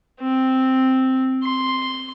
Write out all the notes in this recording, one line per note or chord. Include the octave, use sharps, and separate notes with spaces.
C4
C6